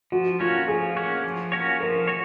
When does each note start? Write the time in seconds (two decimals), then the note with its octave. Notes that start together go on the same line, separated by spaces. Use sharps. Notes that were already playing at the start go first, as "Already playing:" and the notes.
0.12 F3 F#4
0.40 A#3 C#4 F4 F#4 C#5
0.68 F3 G#4
0.96 A#3 C#4 F#4 C#5
1.24 F3
1.52 A#3 C#4 F#4 C#5
1.80 F3 A#4
2.07 F#4 C#5